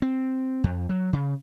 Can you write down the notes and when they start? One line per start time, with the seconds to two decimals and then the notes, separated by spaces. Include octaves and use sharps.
0.02 C4
0.64 F2
0.89 F#3
1.13 C#3